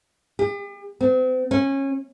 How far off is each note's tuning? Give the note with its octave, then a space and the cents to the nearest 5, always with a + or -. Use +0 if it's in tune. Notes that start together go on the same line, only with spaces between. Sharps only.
G4 +45
C4 -35
C#4 -20